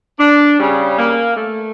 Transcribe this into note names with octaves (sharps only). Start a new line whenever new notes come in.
D4
C#3 G3 C#4
A#3
A3